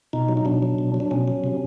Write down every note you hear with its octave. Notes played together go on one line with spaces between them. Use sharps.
B2 D#4
F#3
D#4
B2 D4
F#3
B2
F#3
D4
B2 C#4
F#3
C3